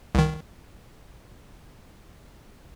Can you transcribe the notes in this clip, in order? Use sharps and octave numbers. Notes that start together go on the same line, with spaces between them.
C2 D#3